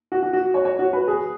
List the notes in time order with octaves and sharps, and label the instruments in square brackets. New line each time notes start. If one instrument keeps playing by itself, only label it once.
[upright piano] F#4
F#4
F#4
C#5
C#5
F#4
B4
G#4